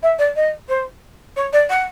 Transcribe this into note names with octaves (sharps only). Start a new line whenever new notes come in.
E5
D5
D#5
C5
C#5
D5
F#5